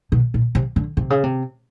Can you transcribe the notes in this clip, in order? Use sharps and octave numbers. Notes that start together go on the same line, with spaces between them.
B2
A#2
C3
D3
C3
C#3
C3